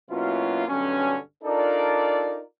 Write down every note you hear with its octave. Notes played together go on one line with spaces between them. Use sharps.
B2 F#3 A#3 C#4 E4 F4
B1 G2 D3 F#3 C#4
D4 D#4 F4 A4 A#4 D5